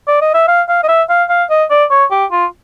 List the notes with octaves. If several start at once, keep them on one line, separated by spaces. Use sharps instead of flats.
D5
D#5
E5
F5
F5
D#5
E5
F5
F5
D#5
D5
C#5
G4
F4